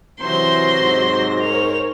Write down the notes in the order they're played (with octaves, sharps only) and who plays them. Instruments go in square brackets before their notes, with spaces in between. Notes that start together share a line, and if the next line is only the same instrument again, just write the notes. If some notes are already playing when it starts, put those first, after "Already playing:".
[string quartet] C3 F#3 A#6 [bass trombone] E3 [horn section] C5 [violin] C6
[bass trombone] G#2
[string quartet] A#4 C5 C#5 [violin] F7